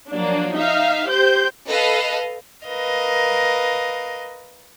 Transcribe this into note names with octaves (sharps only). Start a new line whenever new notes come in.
F3 F#3 A#3 D4
D#4 E5 F5
G4 C5 G6
A4 B4 D#5 F5
A#4 B4 D#5 F5